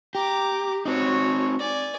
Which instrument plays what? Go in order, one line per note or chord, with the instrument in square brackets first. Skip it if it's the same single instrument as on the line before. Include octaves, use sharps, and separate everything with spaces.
[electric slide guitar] G4 [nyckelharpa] A#5 D6
[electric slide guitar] C4 D#4 [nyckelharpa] F#4 C#5
[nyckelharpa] D5 G#5